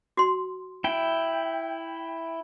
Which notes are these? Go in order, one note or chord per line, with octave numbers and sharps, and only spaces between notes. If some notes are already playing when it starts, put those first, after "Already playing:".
F#4 C6
E4 G5